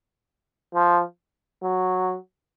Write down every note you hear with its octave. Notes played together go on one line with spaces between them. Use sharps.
F3
F#3